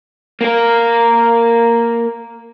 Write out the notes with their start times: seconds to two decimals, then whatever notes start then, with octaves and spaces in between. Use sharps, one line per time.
0.41 A#3 A#4